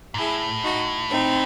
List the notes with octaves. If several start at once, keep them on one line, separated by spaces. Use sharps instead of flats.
G#2
A2 E4 G#4
D#4 F#4
C4 D#4